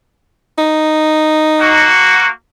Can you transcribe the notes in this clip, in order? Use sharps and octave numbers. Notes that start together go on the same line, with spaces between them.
D#4
A#3 F#4